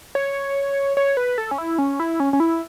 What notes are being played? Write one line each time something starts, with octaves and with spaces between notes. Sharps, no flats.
C#5
C#5
B4
A4
C#4
E4
C#4
E4
C#4
C#4
E4